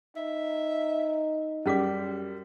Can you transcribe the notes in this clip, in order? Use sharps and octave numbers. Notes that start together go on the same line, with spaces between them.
D#4 E5
F#2 G3 C#4 G4 G#4 D6 B6